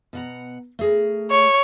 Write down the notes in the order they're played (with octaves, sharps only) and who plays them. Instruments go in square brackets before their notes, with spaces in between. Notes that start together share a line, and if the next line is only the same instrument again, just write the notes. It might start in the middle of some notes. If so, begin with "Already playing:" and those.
[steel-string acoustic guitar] B2 F#5 A#5
A3 G#4 A#4
[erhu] C#5